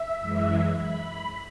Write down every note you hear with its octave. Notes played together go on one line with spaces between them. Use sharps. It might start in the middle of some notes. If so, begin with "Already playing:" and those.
Already playing: E5
F#2 E3 G#3
B5